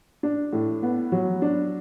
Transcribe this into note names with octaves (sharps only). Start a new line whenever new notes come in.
D4
A2
B3
F#3
D4